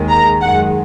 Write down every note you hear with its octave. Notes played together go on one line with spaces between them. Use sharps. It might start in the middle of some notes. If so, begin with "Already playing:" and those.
Already playing: D#2 D#3 G#3
A#5
F#2 D#3 G#3 F#5